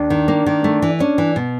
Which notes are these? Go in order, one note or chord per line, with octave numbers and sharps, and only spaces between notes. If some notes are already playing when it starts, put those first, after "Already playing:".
Already playing: D#2 D4
D#3
A#3
D#3
A3
E3
C#4 D4
E3
B2